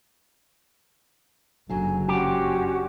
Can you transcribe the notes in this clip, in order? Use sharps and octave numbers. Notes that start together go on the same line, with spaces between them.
F#1 D3 F#3 G#5
C#4 D4 F#4 G4 C5